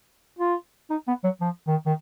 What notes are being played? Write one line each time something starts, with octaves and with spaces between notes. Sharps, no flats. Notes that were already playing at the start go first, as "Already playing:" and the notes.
F4
D#4
B3
F#3
F3
D#3
D#3